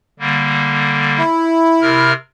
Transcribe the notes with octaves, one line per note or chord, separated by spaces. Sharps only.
D3 G3 A#3
E4
C3 A#4 F6